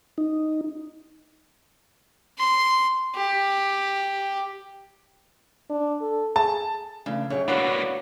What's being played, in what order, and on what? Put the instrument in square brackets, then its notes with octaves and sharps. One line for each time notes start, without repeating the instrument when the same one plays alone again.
[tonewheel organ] D#4
[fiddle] C6
G4
[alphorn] D4
A4
[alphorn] G#4 [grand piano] A5
[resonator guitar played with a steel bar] C#3 [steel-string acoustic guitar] E3 A3 D4
[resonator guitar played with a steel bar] F#2 [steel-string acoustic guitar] G4 G#4 C#5
[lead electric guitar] A#3 B3 [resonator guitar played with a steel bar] D4 F#4 C#5 [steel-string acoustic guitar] E4 D5